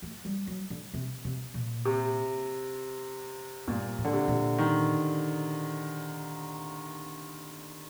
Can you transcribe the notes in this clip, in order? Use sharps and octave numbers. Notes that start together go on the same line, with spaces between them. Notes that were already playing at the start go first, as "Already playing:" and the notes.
A3
G3
F#3
D3
C3
C3
A#2
C3
G2 A#2
A2
D3
C3
A#2
D#3